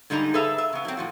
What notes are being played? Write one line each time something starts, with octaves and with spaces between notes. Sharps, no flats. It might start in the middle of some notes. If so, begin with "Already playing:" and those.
G#2 D3 G3 D#4 A4 A#5
G#4 A4 B4 E5 A#5
E5
C#3 B3
F#3 C4
A2 F3 F#4